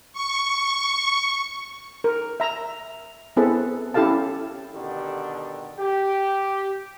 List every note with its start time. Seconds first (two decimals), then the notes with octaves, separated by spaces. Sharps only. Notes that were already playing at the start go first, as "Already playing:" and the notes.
0.13 C#6
2.04 A#4
2.40 E5 A#5
3.37 B3 C4 E4 G#4 A4 B4
3.94 C#4 E4 G4 A4 F5 A5
4.74 B2 D3 D#3 G4
5.78 G4